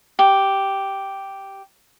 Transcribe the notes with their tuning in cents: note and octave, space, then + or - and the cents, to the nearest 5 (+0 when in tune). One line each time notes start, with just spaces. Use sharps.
G4 -5